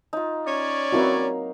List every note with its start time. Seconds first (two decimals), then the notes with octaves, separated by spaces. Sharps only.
0.13 D#4 F4
0.46 C#4 C#5 D5
0.92 F#3 A#3 C4 D#4 E4 F#4